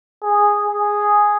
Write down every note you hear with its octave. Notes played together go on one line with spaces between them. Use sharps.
G#4
G#4